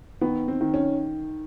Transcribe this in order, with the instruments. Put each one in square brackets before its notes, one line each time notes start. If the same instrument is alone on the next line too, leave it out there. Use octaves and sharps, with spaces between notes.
[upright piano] D#3 [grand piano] B3
[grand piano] C4
[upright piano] D#3
[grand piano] C#4